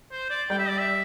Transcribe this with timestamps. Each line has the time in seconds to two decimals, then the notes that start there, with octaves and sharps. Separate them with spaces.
0.12 C5
0.30 D5
0.49 G3 G5
0.59 E5
0.68 D5
0.78 E5